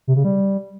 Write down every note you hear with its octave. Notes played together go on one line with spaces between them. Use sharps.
C3
C#3
G3